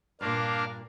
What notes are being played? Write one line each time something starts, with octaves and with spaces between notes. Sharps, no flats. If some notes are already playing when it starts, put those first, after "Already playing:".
G2 A#2 A#3 D4 F5